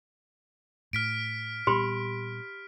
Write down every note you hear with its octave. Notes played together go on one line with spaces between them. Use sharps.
A2 F6 B6 D7
A#2 G3 B3 G4 B5 C6